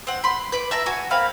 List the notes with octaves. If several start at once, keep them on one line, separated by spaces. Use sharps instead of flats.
C4 F#5
B5 C6
B4 B5 D6
E5 A5 A#5 E6
F#4 G#5
A#3 C4 F5 B5